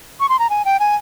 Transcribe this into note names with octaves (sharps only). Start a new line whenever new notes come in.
C#6
C6
A#5
G#5
G5
G#5